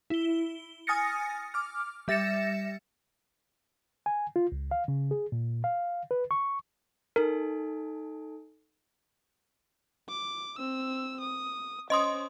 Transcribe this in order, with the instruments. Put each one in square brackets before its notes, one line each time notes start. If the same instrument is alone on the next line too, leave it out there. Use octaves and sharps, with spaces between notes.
[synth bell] E4 G7
G#5 D#6 F6 A6 A#6 C#7
D6 F6
G3 E5 A6 A#6 C#7 E7
[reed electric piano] G#5
F4
C#2
F5
C#3
G#4
A#2
F5
B4
C#6
[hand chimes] D#4 A4 G#5 [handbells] A#4
[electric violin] D6
C4 E6
D#6
[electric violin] C#4 C5 [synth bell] D#5 C6 D#6